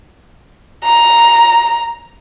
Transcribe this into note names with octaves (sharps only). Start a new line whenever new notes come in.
A#5